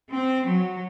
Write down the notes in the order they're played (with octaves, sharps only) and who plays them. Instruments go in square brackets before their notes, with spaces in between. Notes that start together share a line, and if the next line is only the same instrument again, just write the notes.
[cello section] C4
F#3